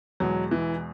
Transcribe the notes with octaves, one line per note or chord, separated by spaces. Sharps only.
E2 B2 F#3 G#3
E3